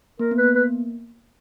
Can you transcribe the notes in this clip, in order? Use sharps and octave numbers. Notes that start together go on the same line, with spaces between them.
A#3 A#4
B3
B4
B3
A#3 B4